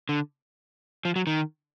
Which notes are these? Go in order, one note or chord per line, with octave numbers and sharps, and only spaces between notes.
D3
F3
F#3
D#3